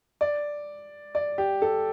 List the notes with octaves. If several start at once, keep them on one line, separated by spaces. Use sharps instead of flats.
D5
D5
G4
A4